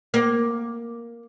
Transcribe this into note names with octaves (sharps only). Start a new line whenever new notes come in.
A#3